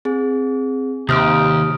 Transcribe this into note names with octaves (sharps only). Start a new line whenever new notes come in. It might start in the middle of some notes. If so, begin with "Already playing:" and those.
C4 G#4
D#2 C3 D#6 F6 D7